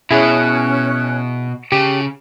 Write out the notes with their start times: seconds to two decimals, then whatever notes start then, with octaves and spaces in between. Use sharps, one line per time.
0.11 B2 C#4 E4 G#4 F#6
1.72 C#3 G4 A5